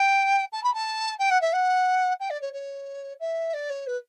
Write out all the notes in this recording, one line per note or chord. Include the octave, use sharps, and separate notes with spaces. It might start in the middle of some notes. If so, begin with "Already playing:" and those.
Already playing: G5
A5
B5
A5
G5
F#5
E5
F#5
G5
D5
C#5
C#5
E5
D5
C#5
B4